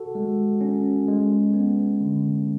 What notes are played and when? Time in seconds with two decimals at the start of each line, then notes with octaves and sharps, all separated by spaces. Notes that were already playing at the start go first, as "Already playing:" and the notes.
Already playing: F#4 A4
0.15 G#3
0.61 C#4
1.08 G#3
1.54 B3
2.01 D3